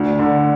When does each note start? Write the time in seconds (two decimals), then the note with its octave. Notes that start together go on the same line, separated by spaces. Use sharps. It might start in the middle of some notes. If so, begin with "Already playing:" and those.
Already playing: D2 D4
0.19 D3